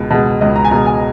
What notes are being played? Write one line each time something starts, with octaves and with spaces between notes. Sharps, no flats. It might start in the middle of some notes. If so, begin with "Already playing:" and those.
Already playing: C#2 B2 G#3
B2 G#3
C#2 D#5
A#5
G#5
B2 G#3 A#5
G#5